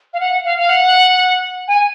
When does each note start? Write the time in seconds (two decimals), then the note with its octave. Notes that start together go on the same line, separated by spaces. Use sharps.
0.14 F5
0.20 F#5
0.45 F5
0.58 F5
0.69 F#5
1.68 G#5